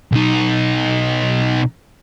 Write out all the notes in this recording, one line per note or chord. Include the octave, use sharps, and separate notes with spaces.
B1 D#4